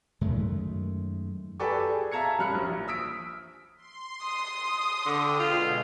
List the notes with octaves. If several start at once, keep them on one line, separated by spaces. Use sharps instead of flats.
F#2 D#3 G#3 A3
G4 A4 B4 D5 G#5 C#6
G#4
E5 F5 A5 A#5 G#6 C#7
F#2 G3 B5 F6 F#6 C#7
A#1
D#6 E6 B6 D7
C6
D#6
D3 G5
B2 G#3 F4